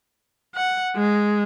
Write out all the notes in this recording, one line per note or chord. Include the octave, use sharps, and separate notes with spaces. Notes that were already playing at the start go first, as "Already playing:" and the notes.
F#5
G#3